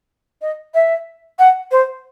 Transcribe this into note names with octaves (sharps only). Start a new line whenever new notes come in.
D#5
E5
F#5
C5